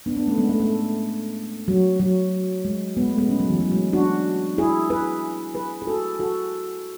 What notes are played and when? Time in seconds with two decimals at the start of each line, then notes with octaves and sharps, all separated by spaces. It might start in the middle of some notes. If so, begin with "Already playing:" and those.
0.06 B3 D4
0.17 B3 D4
0.27 A3 C#4
0.38 G#3 B3
0.49 A3
0.60 A3
1.68 F#3
2.00 F#3
2.65 G#3
2.97 G#3 B3
3.08 A3
3.18 G#3 B3
3.28 A3 C#4
3.40 F#3
3.50 E3
3.61 F#3
3.72 G#3
3.93 D4 F#4
4.58 E4 G#4
4.90 G#4 B4
5.55 G#4 B4
5.82 G#4
5.87 F#4 A4
6.19 F#4 A4